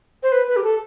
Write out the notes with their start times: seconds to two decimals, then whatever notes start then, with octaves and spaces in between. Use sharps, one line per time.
0.23 C5
0.32 B4
0.48 B4
0.56 G4
0.64 A4